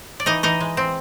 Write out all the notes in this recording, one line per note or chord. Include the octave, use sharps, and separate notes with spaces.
D5
E3 D#4 D#5
E3 D#4 D#5
G#3
C4